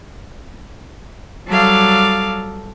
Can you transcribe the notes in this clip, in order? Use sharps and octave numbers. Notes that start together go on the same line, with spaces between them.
F#3 G3 A4 F5 D6